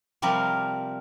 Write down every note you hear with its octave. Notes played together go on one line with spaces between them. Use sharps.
C3 F3 G3 A#4